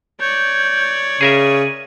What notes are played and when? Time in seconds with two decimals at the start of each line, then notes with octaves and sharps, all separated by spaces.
0.20 C#5 D5 G6
1.21 C#3 G#4 A#4 E5 D#7